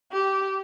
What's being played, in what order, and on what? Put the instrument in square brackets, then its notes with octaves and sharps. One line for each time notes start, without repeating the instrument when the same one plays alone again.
[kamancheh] G4